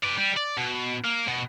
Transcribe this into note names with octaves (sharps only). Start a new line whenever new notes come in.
B4 D5
G3
D5
B2
A#3
B2